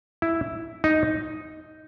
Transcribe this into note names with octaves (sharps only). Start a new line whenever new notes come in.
E4
D#4